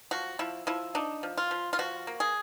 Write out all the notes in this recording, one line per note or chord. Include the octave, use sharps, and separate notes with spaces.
F3 F#4
F3 E4
F3 E4
D4 D#4
F3
F4
F3
F4
F3 F#4
A#3
G#4